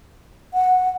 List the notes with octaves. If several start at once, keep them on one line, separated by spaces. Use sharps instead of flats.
F#5